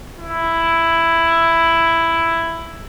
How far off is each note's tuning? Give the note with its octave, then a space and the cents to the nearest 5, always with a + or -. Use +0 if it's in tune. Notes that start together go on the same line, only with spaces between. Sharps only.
E4 +5